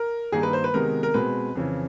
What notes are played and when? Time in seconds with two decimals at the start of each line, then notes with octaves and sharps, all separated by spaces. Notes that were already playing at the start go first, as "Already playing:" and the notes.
Already playing: A#4
0.32 G2 D#3 G3 A#3 G#4
0.43 B4
0.53 C5
0.64 B4
0.74 C3 D#3 G#3 B3 A#4
1.03 A#4
1.14 B2 G#3 C4 B4
1.55 F2 C#3 E3